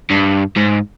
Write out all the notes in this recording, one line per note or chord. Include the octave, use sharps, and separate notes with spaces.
G2
G#2